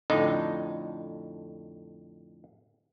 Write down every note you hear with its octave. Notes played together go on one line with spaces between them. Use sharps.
F2 A2 D3 D#4